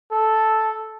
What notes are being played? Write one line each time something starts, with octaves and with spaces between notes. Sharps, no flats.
A4